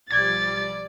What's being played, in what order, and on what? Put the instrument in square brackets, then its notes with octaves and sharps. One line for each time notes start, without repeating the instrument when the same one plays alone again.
[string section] B1 F3 G3 [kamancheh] D5 [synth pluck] G#6 [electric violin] A6